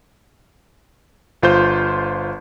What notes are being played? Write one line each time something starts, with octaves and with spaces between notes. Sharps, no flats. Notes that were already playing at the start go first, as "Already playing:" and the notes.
G1 F4 C5 G6